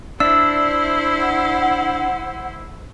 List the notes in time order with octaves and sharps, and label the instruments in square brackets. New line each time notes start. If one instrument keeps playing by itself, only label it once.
[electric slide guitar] D4 D5 E5 [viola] E4 C5 [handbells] E6
[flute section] F#5